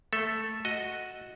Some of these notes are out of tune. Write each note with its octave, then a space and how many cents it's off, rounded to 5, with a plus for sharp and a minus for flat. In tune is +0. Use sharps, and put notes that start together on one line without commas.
A3 +0 A4 +0 E5 +0
F#4 -5 D#5 +0